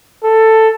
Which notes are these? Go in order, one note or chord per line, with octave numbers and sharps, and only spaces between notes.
A4